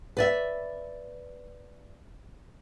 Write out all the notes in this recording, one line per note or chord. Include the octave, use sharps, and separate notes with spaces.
B4 D5 E5